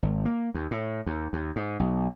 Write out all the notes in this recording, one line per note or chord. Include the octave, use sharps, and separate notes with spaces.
G#1
A#3
D#2
A2
D#2
D#2
G#2
B1